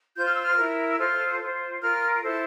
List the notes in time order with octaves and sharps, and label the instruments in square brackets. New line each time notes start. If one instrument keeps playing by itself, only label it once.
[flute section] F4 C5 G6
F6
E6
F6
E4 A#4
E6
F4 A4 C5 F6
F4 C5
F4 A#4 F6
E4 A4 C5